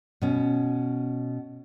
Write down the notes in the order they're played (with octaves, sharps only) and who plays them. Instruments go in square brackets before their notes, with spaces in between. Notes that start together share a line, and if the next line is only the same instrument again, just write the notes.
[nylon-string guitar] B2 C#4